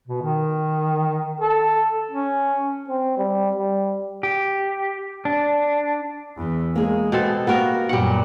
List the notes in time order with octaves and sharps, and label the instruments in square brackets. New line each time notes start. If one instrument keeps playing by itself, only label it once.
[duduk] B2
D#3
A4
C#4
[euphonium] C4
G3
G3
[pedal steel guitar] G4
D4
[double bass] E2
[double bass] G#3 [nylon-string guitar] A#3 G#4
[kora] B2 C4 A4
[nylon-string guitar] A#3 F#4 G4 [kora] B3 A#4
[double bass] F#2 A#2 [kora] G3 F#5